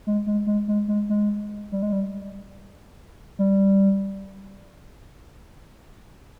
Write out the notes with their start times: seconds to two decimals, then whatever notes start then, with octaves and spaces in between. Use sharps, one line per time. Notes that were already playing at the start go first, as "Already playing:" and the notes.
0.07 G#3
0.27 G#3
0.47 G#3
0.68 G#3
0.88 G#3
1.09 G#3
1.72 G3
1.82 G#3
1.93 G3
3.39 G3